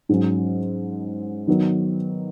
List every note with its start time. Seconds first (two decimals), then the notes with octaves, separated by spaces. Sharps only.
0.09 G#2 F#3 C#4
1.47 D#3 F#3 B3